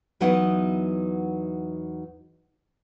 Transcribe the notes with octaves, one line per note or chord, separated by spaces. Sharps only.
E2 F#3 B3 D#4 E4 F#5